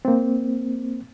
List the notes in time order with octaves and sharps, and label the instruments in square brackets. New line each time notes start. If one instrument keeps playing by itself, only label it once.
[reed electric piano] A#3 C4